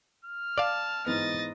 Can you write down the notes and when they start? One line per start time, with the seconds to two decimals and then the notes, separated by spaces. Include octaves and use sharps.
0.25 F6
0.58 D5 F5 A5
1.06 G#2 E3 B3 D#5 A6